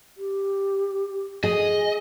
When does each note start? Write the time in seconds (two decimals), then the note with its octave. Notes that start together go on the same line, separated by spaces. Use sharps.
0.17 G4
1.44 G#4 D#5 G#5